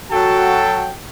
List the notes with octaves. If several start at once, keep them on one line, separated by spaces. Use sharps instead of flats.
F#3 F#4 A4 G5 A5